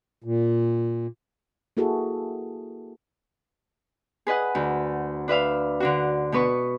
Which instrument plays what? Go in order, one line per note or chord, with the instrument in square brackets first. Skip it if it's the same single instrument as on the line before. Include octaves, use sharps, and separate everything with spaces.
[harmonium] A#2
[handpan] A#3 E4 F#4 G#4 A4
[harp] G#4 B4 D#5 F#5
D2
D4 B4 E5 F5
D3 D4 F#4
B2 B3 B4 C#6